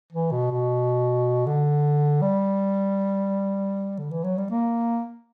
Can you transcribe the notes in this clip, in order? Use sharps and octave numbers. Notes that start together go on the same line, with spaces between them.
E3
B2
B2
D3
G3
D3
E3
F#3
G3
A#3